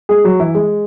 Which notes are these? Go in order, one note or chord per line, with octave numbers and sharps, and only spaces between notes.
G#3 G#4
F#3 F#4
E3 E4
G#3